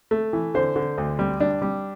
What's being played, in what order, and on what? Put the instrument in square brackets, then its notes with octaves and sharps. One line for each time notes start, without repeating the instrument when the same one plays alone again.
[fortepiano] A3
E3
D3 C5
D3
D2
G3
G3 D4
G3